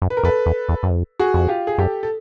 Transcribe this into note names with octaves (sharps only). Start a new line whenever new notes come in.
F#2
B4
A#4
F2 A4 B4
E2
E2
F#2
F2
F#4 G#4
F2
F4 G4
G#4
F#2 G4 A4
A4